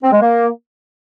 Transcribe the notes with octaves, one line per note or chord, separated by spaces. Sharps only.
C4
G#3
A#3